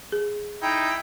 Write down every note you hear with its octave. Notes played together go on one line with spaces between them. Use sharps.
G#4
D#4 E4 G5